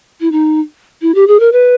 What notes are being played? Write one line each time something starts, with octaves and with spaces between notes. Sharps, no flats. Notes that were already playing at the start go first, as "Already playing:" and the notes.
E4
D#4
E4
G4
G#4
A#4
B4